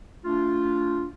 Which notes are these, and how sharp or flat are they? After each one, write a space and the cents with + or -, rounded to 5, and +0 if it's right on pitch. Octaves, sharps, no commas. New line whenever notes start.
A3 +15 D4 -25 F4 +0